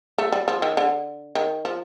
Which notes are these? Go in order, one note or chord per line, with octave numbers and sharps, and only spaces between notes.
A3
G3
F3
D#3
D3
D#3
F3